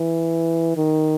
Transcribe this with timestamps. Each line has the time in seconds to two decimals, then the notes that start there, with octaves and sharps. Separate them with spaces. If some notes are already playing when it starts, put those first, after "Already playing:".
Already playing: E3
0.77 D#3